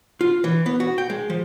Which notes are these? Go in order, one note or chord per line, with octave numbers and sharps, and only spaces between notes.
F4
E3
B3
F#4
G5
G#3
F3